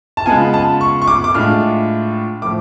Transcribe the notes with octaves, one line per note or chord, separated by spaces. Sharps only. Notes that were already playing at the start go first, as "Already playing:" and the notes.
A5
C#3 G#3 B3 F4 G#5
A5
C#6
C#6
D6
D6
A2 G#3 D4 F4 F6
A2 F3 D6